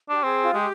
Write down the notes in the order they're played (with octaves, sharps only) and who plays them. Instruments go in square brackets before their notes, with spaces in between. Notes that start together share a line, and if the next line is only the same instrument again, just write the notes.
[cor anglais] D4 [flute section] G4
[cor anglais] C4 [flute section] G#4
[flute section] F4
[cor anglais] G#3 [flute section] G4